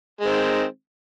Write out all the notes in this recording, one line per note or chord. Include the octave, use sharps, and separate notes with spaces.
D#3 G#3 C4